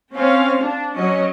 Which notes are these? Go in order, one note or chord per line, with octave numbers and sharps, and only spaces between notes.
C4 C#4 F5
D4
F#3 C#4 D#5